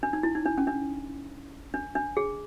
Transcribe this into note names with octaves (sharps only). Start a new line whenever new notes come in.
D4
D#4
E4
D#4
D4
C#4
D4
D4
D4
G#4